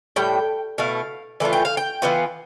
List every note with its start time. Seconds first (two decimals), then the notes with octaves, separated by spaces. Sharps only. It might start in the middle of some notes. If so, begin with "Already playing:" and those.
0.16 A2 G3 G5
0.78 B2 A3 E4 F5
1.40 E3 A3 D4 F4
1.53 G5
1.65 F5
1.77 G5
2.02 E3 B3 F4